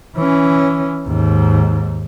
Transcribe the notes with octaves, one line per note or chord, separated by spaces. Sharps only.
E3 C#4
D#2 G#2